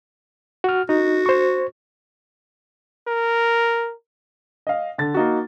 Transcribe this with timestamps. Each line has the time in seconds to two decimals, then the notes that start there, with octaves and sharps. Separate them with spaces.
0.64 F#4 F6
0.89 D#4 F#4
1.26 C5 C#6
3.07 A#4
4.67 D#5 F5
4.98 D3 A6
5.14 A#3 D#4 F#4